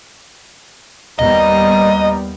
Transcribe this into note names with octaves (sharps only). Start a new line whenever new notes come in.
D#2 G3 B3 D#5 A#5